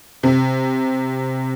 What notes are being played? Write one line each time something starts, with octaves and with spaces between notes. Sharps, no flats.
C3